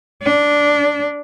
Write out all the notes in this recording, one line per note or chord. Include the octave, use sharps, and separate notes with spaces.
D4